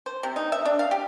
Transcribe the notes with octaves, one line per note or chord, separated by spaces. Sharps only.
C5
C3
D#4
E5
D4
F5
G4